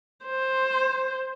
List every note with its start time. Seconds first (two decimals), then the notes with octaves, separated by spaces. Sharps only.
0.26 C5